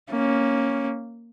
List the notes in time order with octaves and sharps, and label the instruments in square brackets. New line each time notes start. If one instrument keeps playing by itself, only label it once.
[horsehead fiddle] A#3 C#4